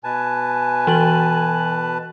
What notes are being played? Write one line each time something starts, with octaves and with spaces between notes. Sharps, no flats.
B2 B4 G#5 A5
E3 F#4 F#7